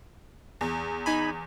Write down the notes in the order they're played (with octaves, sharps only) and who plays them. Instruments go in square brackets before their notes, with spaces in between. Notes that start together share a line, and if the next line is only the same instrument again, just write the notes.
[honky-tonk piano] E2
[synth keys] D#4 G#5 B5